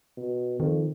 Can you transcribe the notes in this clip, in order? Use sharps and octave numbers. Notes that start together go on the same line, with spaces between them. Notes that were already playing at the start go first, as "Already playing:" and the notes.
B2
F2 D#3